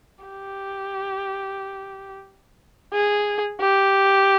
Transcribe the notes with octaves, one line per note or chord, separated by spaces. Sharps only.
G4
G#4
G4